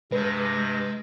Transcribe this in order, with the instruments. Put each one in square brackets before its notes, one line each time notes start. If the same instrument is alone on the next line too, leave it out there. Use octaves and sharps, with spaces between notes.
[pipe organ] G2 C3 A#6 [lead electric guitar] G#3 [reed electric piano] B4